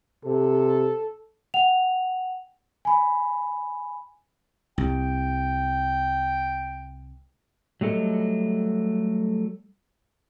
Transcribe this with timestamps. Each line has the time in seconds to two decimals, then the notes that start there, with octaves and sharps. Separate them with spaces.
0.25 C3 A4
1.54 F#5 G5 F7
2.85 G#5 B5
4.78 C2 G5
7.81 F#3 G3 A3 A4 D#5